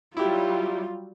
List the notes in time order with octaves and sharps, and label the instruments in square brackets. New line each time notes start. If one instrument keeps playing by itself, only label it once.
[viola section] F#3 G3 [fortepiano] E4 G4 [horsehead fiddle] F4